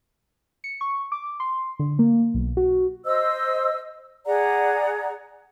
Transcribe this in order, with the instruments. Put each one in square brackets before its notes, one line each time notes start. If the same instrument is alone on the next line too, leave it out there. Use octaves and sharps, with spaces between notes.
[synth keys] C#7
C#6
D6
C6
D3
A#3
B1
F#4
[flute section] C5 D#5 E6
G#4 D5 F#5 A#5